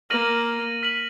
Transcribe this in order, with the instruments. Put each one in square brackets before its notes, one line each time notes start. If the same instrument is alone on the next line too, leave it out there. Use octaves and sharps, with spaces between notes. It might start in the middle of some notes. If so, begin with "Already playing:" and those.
[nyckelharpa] A#3 [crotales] F6 A#6 D#7 F#7
[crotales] F6 B6 F#7